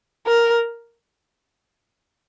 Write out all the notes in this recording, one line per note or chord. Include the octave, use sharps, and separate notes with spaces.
A#4